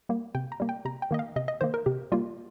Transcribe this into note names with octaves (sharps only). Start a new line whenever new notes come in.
G3 A#3
C3 G5
A#5
G3 A#3
G5
C3 A#5
G5
D#3 A#3 D#5
F5
C3 D#5
D#5
D#3 A#3 C5
A#4
C3 G4
G3 A#3 F4